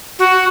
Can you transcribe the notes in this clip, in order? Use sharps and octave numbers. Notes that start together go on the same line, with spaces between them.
F#4